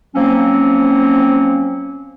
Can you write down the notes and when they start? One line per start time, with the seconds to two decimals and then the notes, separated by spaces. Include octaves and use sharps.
0.15 F3 F#3 A#3 C4 C#4